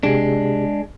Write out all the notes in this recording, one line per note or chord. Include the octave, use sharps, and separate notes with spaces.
C3 G#3 D4 G4 G#4